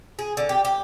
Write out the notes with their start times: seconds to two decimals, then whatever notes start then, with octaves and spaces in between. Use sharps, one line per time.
0.19 G#4
0.37 D3
0.49 G4
0.65 G4